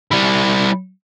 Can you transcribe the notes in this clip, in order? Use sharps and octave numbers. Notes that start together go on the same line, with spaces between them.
G3 E4